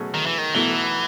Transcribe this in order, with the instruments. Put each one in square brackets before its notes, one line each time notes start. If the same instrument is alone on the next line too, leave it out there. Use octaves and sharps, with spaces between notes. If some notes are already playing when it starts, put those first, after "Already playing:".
Already playing: [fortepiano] B2 F#3 A3 C#4 G#4
[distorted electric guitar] D#3
E3
D#3
[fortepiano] B1 B2 A3 E4 [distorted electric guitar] E3